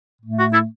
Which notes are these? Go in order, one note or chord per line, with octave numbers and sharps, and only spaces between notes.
A2 A3
F#4
E4 A4